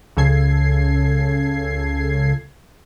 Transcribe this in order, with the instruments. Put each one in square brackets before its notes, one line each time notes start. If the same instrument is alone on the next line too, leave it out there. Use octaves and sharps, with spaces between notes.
[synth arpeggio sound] C#2 C#3 A4 G#6 C7